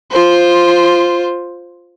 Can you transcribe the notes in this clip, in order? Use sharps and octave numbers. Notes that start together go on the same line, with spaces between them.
F4 C5